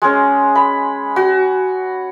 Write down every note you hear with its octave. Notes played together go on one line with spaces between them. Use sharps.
G#3 C#4
B5
F#4